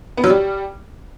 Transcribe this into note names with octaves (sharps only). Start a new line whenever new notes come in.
B3
F#3
G3